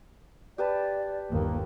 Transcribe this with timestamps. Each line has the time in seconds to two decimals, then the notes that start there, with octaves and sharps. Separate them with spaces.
0.58 G4 B4 D5 A5
1.30 G1 D#2 A#3